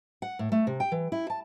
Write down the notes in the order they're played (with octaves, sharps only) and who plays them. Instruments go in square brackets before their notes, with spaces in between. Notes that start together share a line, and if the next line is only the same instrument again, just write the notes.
[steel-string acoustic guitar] F#5
A2
A3
C3
G5
E3
E4
A5